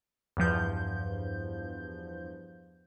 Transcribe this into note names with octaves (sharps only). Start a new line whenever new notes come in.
E2 G2 F3 G6